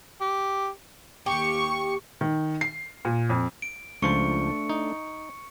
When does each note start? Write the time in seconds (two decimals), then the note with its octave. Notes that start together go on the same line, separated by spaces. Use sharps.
0.21 G4
1.26 D#2 G4 C#6
2.21 D#3
2.61 C7
3.05 A#2
3.30 F2
3.62 D7
4.02 C#2 F3 A3 D4 C5 C#6 C#7
4.69 D#4